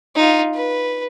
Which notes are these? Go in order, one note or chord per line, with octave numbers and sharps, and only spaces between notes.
D#4 F4
B4